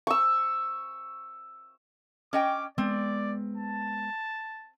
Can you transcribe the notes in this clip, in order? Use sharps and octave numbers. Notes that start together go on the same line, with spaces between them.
C#6 E6
C#4 D#5 G5 D6
G#3 B3 C4 D5
A5